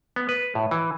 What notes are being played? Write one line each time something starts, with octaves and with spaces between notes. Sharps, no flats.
B3
B4
A2
E3